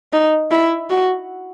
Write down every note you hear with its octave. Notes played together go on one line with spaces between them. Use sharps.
D#4
E4
F#4